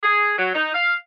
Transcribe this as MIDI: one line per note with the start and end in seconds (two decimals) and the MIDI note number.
0.04 0.35 68
0.37 0.53 54
0.54 0.72 63
0.74 0.94 77